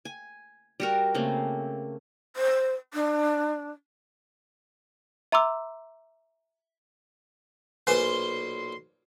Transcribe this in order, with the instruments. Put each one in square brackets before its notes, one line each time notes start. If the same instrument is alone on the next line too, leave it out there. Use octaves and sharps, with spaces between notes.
[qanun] G#5
G3 F#4 A#4
C#3 A3 A#3 C4
[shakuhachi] C5
D4
[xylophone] E5 A#5 C6 D6 E6
[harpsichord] B1 A#2 C5 [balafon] B4 G#5 [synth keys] C6